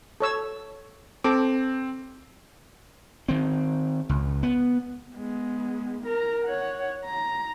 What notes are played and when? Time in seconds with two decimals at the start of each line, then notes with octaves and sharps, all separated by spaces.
0.20 A4 C#5 E6
1.24 C4 A4 D6
3.28 D#3 C4
4.09 C#2
4.43 B3
5.17 G#3 B3
6.04 A#4 A#5
6.45 C#5 F#5
7.05 A#5